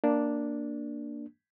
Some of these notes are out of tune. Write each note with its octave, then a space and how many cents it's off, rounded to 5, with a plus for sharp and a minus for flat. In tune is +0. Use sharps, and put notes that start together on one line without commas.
A#3 +0 D4 +0